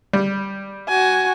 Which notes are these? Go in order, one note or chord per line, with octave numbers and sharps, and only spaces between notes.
G3
F#4 G#5